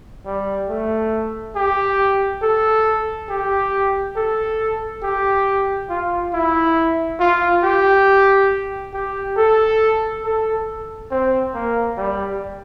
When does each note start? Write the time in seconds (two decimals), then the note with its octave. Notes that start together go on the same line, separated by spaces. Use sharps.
0.25 G3
0.69 A3
1.55 G4
2.42 A4
3.29 G4
4.16 A4
5.03 G4
5.89 F4
6.33 E4
7.20 F4
7.63 G4
8.93 G4
9.37 A4
10.24 A4
11.10 C4
11.54 A#3
11.97 G3